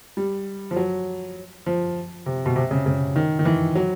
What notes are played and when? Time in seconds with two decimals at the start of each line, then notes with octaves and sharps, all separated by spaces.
0.17 G3
0.71 F3
0.76 F#3
1.66 F3
2.26 C3
2.46 B2
2.56 C3
2.71 C#3
2.86 C#3
3.16 D#3
3.39 D#3
3.45 E3
3.75 F#3